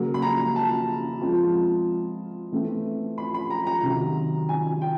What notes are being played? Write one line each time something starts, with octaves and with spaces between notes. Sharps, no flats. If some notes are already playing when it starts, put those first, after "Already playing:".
Already playing: C#3 F#3 A#3
B5
A#5
A5
F3 G#3 C4 F4
E3 A3 C4
B5
B5
A#5
A#5
C3 D#3 F#3
G#5
G5